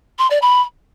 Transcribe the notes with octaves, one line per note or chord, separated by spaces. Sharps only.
C6
D5
B5